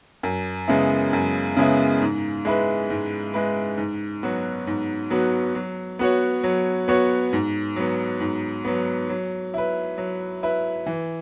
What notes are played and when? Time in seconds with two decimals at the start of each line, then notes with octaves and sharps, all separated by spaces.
0.23 F#2
0.68 C#3 G#3 B3 E4
1.13 F#2
1.57 C#3 G#3 B3 E4
2.02 G#2
2.45 G#3 E4 B4
2.90 G#2
3.34 G#3 E4 B4
3.78 G#2
4.23 F#3 B3 F#4
4.67 G#2
5.10 F#3 B3 F#4
5.55 F#3
5.99 B3 F#4 C#5
6.44 F#3
6.88 B3 F#4 C#5
7.33 G#2
7.76 F#3 B3
8.20 G#2
8.65 F#3 B3
9.09 F#3
9.54 E4 B4
9.98 F#3
10.43 E4 B4
10.86 E3